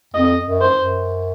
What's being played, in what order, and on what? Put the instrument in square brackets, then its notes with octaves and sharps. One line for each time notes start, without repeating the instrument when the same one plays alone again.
[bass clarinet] F2 [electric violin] D#5
[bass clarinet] F#2
[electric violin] C5
[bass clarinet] F#2